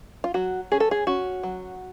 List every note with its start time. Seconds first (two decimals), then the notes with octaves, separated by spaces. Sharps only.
0.24 F4
0.34 F#3 F#4
0.72 C#4 G#4
0.80 A4
0.91 G#4
1.07 C#4 F#4
1.43 F#3